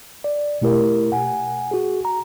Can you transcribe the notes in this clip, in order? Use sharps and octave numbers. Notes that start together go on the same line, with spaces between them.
D5
B2 A3 E4 G4 A#4
F#5 G#5
F#4 G#4
A#5